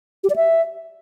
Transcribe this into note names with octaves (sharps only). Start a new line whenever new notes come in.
G4
D5
E5